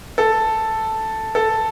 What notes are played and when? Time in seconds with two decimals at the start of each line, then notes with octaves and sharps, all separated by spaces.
0.18 A4
1.35 A4